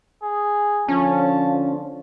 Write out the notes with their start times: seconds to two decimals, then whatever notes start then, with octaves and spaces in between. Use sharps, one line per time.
0.23 G#4
0.88 D3 F3 C#4 A5